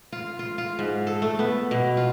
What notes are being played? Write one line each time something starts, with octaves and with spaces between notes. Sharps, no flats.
F4
F4
F4
G#2
A4
A3
B3
B2
F4